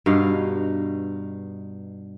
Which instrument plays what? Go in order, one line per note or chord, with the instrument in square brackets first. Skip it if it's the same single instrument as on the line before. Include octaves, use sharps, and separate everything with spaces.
[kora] G2 B2 D#4 F5